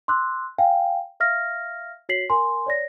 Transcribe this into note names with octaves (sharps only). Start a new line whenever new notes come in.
C6 D6 E6 F#6
F5 G5 G#5
E5 F5 F6 A#6
F#4 C#5 B6 C7 F#7
A#4 G#5 C6
C#5 D5 A#6